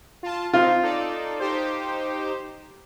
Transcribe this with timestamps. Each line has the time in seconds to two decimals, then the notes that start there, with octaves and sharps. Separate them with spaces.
0.23 F4 A5
0.53 C4 D#4 F4
0.82 D#4 A4 D5
1.39 D#4 G4 C5